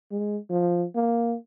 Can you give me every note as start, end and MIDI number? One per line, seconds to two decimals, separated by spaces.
0.11 0.37 56
0.50 0.85 53
0.95 1.36 58